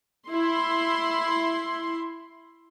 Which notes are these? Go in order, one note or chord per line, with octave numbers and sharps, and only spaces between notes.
E4 C6